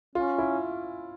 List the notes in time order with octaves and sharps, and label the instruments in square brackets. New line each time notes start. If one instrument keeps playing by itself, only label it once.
[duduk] C#4 [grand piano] F4
[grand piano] E4